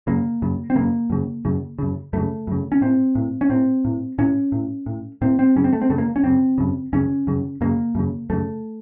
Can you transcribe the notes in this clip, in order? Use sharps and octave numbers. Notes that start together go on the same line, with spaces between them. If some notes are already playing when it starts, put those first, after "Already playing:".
F#2 C#3 A#3
F#2 C#3
C4
F#2 C#3 A#3
F#2 C#3
F#2 C#3
F#2 C#3
F#2 C#3 A3
F#2 C#3
C#4
A2 C4
A2
C#4
A2 C4
A2
A2 C#4
A2
A2
A2 C4
C4
F#2 C#3 C#4
C4
A3
C4
F#2 C#3 A3
A#3
C#4
F#2 C#3 C4
F#2 C#3
F#2 C#3 C#4
F#2 C#3
F#2 C#3 A#3
F#2 C#3
F#2 C#3 A3